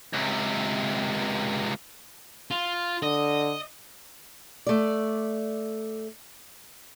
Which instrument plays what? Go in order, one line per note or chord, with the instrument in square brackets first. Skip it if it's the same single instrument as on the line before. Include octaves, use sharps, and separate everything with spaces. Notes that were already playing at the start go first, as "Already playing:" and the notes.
[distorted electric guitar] C#2 C3
F4
[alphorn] D3 [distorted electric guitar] D#5
[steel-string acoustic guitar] A3 D5